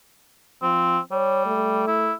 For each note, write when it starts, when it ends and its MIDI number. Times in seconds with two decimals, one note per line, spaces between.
0.62 0.98 53
0.62 0.99 60
1.11 1.87 55
1.11 1.46 73
1.46 2.13 57
1.87 2.13 64